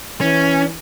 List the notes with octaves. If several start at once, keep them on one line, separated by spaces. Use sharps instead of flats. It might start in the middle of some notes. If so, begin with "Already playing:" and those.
E3 C#4